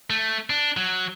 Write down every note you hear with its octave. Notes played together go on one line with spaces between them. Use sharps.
A3
D4
F#3